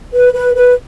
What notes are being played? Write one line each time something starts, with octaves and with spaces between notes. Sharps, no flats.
B4
B4
B4